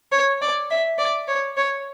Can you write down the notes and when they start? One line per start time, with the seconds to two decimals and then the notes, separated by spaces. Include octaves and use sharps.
0.12 C#5
0.41 D5
0.70 E5
0.98 D5
1.28 C#5
1.57 C#5